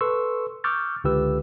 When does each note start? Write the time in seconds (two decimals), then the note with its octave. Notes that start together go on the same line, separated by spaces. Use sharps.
0.01 A4 B4 C6 C#6 E6
0.64 C#6 D6 E6 F6 G6 A6
1.04 C#2 D3 F4 G4 B4 E6